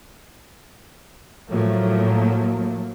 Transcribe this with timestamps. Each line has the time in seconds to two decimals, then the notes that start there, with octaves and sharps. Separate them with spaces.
1.50 A2 F3 F#3 A3 A#3